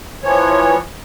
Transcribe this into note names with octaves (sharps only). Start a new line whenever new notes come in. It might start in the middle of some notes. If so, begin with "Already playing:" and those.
E3 F3 C#5